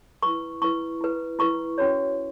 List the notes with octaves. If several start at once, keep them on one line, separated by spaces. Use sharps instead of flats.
E4 B4 C#6
E4 B4 C#6
E4 B4
E4 B4 C#6
C#4 F#4 C#5